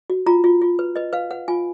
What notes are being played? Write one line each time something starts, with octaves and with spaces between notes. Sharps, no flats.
F#4
F4 A#5
F4
F4
B4
B4 D#5
B4 F5
B4 F#5
F4 G#5